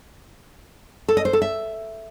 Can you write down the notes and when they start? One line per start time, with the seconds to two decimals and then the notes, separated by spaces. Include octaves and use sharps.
1.08 A4
1.17 D#5
1.25 C5
1.33 A4
1.42 E5